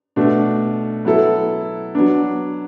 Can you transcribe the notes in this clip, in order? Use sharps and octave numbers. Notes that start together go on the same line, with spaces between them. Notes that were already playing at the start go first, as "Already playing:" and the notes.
B2 A3 D4 F#4
F#3 B3 E4 A4
F#3 B3 D4